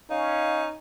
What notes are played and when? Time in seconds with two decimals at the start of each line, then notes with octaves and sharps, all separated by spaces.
0.10 C#4 D#4 F5